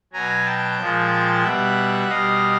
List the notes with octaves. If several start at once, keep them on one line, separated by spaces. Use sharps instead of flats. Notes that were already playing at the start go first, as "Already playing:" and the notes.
B2 F#3 G#5 A#5
G5 A5
A#2 F3 G#3
B2 G3 E5 F#5
B2 G3 D#5 F5